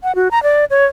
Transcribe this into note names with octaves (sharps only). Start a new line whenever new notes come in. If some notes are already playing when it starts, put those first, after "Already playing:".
F#5
F#4
A#5
D5
C#5